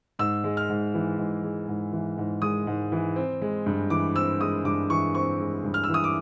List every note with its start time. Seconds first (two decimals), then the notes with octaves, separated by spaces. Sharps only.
0.19 G#2 E6
0.44 G#3
0.57 F6
0.69 G#2
0.94 E3
1.18 G#2
1.44 G#3
1.68 G#2
1.93 E3
2.18 G#2
2.42 G#3 D#6
2.67 G#2
2.92 E3
3.16 C4
3.42 G#3
3.66 G2
3.90 E3 D6
4.15 C4 E6
4.40 G#3 D#6
4.65 G2 D6
4.90 E3 C#6
5.15 C4 C#6
5.40 G#3
5.64 G2
5.74 F6
5.84 E6
5.89 E3 D#6
6.04 D6